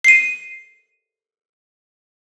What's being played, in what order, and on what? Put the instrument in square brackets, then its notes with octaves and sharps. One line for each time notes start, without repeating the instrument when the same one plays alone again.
[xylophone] C7 D#7